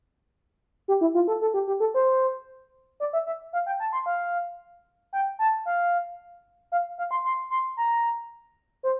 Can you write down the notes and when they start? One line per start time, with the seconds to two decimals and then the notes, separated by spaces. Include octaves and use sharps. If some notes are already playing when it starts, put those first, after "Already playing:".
0.88 G4
1.01 E4
1.14 F4
1.28 A4
1.41 A4
1.54 G4
1.67 G4
1.80 A4
1.94 C5
3.00 D5
3.13 E5
3.27 E5
3.53 F5
3.66 G5
3.80 A5
3.93 C6
4.06 F5
5.13 G5
5.39 A5
5.66 F5
6.72 F5
6.98 F5
7.11 C6
7.25 C6
7.50 C6
7.77 A#5
8.83 C5